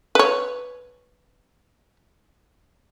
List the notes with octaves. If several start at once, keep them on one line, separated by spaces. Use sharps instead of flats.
B4 C#5